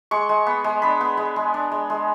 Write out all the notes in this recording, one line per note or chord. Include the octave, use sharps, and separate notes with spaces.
G#3 C#6
G#3
B3
G#3
D4 B5
B3
G#3
G#3
D4
G#3
G#3